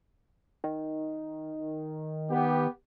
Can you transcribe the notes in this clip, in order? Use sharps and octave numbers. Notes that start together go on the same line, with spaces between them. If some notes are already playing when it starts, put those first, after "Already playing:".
D#3
B3 G4